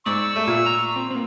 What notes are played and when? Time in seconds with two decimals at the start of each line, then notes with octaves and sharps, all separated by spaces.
0.06 G#2 D5 C#6 E6
0.36 A3
0.47 A#2
0.66 A#5
0.96 C4
1.11 A#3 C4